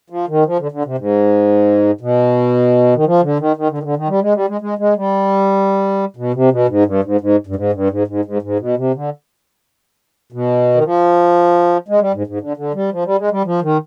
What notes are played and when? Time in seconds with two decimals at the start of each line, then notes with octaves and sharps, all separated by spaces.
0.10 F3
0.28 D#3
0.46 F3
0.59 D3
0.72 D3
0.85 C3
0.98 G#2
2.01 B2
2.95 D#3
3.06 F3
3.22 D3
3.39 D#3
3.56 D#3
3.70 D3
3.78 D#3
3.83 D3
3.96 D#3
4.08 G3
4.22 G#3
4.34 G3
4.48 G#3
4.61 G#3
4.78 G#3
4.96 G3
6.16 B2
6.34 C3
6.51 B2
6.68 G#2
6.85 G2
7.04 G#2
7.21 G#2
7.47 G2
7.56 G#2
7.73 G2
7.90 G#2
8.07 G#2
8.25 G#2
8.42 G#2
8.60 B2
8.77 C3
8.94 D3
10.32 B2
10.75 D#3
10.84 F3
11.88 G#3
12.00 G3
12.14 G#2
12.27 G#2
12.41 D3
12.57 D3
12.74 G3
12.92 F3
13.05 G3
13.18 G#3
13.31 G3
13.45 F3
13.62 D#3